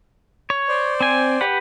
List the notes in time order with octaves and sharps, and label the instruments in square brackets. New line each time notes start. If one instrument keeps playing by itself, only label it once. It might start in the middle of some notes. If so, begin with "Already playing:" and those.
[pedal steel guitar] C#5
[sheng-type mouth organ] C5 D5
[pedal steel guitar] C4 G#5
G4 B4 F#5